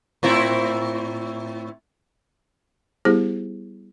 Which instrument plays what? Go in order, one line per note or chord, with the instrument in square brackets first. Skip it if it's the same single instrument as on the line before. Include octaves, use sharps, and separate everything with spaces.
[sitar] A2 C4 E4
[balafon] G3 B3 E4 G4 G#4 C5